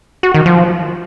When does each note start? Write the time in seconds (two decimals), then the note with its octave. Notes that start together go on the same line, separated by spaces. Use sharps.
0.23 F#4
0.34 D#3
0.46 F3